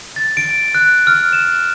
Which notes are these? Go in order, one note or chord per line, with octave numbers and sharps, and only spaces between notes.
A6
D7
F#6
F6
E7